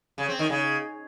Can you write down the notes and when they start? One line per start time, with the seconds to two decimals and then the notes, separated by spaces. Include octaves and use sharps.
0.18 C#3
0.28 C4
0.39 D#3
0.50 C#3